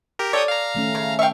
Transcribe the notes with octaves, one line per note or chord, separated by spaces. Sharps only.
G4 A#4
A4 C#5 D5 G5 D#6
F5 A#5
D#3 A3 C#4
C#3
E5 F5 G5 C#6